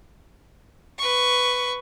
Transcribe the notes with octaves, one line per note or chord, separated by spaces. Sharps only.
B4 C#6